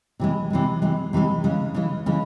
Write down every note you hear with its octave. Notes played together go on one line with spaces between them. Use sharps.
C3 E3 G#3
C3 E3 G#3
C3 E3 G#3
C3 E3 G#3
C#3 E3 G#3
C#3 E3 G#3
C#3 E3 G#3